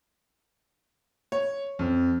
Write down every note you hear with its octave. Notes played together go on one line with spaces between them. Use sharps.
C#5
F2